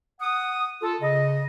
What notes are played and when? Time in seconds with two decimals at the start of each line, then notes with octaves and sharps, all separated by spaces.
0.21 F#5 D#6
0.83 F4 A4
1.01 C#3 D#5